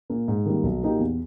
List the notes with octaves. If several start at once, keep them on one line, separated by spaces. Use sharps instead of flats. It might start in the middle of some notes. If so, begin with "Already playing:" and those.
A#2 A#3
G#2
D#3 G3 A#3
B1
A#2 A#3 D#4 G4
E2